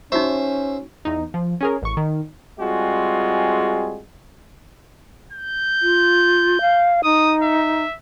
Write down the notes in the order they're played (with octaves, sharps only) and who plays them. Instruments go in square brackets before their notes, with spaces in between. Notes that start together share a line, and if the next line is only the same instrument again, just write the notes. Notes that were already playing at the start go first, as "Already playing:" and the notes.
[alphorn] C#4 [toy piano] D#4 F#4 C#6 [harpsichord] C5 E5
[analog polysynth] E2 D#4
F3
C#4 G#4 A#4
A1 C#6
D#3
[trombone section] G3 G#3 C4 F4 F#4 G#4
[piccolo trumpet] G6
[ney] F4
F5
[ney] D#4 [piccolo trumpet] D#6
[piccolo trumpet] E5